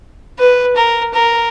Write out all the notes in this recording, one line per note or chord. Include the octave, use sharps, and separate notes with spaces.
B4
A#4
A#4